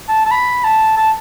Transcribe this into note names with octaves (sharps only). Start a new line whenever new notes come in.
A5
A5
B5
A5
A5